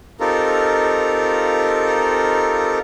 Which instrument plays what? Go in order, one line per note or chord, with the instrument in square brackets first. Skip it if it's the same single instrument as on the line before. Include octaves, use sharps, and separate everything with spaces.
[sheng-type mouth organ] C4 D#4 F4 G4 A4 A#4